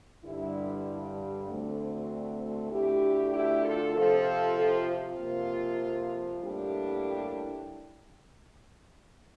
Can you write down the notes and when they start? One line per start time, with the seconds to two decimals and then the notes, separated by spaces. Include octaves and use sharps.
0.24 G2 D3 G3 E4
1.48 D2 D3 A3 C4
2.71 D2 D3 A3 D4 E4 G4
3.33 E4 G4
3.64 F4 A4
3.94 C3 F3 C4 F4 A4
4.56 F4
4.87 F4
5.18 F2 C3 F3 A#3
6.41 A2 G3 A#3 D4 E4 G4